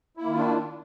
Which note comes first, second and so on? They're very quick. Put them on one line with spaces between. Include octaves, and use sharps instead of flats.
E4 A#3 D#3 F4 D4